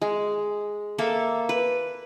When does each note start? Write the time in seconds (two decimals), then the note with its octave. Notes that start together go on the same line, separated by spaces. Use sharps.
0.02 G#3
0.98 A#3 A4 E5
1.49 B4